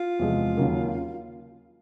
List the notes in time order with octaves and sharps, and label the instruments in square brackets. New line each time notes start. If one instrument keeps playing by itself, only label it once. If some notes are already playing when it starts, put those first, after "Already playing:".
Already playing: [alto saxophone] F4
[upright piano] E2 C3 F3 G#3
D#2 C#3 F#3 A#3